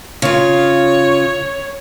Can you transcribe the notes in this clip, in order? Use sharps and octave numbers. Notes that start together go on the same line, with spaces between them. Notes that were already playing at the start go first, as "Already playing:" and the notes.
C#3 F4 C#5